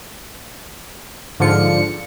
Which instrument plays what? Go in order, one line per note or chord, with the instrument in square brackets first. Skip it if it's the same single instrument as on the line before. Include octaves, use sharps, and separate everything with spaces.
[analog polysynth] G#2 D3 F3 F4 C#7